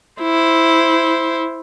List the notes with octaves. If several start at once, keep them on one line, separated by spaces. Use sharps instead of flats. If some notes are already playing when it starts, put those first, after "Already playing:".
E4 C5